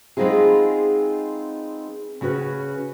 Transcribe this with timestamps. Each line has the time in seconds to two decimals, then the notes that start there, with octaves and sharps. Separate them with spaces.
0.17 G#3 B3 C4 D#4 F4 G#4
2.21 C#3 C#4 F#4 B4